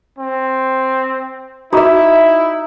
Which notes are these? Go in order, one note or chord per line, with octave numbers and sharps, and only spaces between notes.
C4
D#4 E4 F#4 D#5 E5 D6